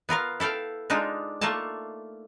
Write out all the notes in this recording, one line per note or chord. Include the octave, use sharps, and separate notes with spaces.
B3 F4 A#4 F5
E4 A4 F5 G5
G#3 D4 D#4 F4
A3 A#3 F4 A4 A5